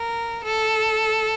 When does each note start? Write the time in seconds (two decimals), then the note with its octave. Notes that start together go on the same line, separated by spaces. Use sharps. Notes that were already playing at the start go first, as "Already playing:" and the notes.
Already playing: A#4
0.44 A4